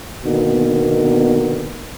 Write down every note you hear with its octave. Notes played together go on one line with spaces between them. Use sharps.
B2 D3 D#3 A#3 B3